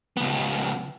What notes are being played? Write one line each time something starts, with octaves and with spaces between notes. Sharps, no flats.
C#2 B3